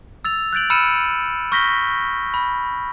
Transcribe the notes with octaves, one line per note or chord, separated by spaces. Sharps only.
E6 A6 F7
F#6 G6 A6 D7 F#7
B5 E6 F6 C#7 D#7 E7
C#6 F6 G6 A#6 B6 G7
B5